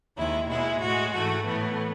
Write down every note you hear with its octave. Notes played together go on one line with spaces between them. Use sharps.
D#2 D#3 G#3 E4
B2 G#3 E4
A2 G#3 F#4
G#2 E3 A3 F#4
A2 E3 A3 B3